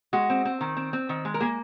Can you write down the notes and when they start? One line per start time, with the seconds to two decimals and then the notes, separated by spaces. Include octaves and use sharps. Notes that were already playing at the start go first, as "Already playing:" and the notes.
0.13 G#3 F#4
0.30 C4
0.45 C4
0.61 D#3
0.77 C4
0.93 C4
1.09 D#3
1.25 G#3
1.34 A#4
1.40 A#3 G#4